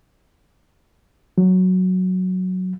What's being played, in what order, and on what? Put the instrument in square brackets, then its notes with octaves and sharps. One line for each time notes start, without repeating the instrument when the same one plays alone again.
[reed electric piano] F#3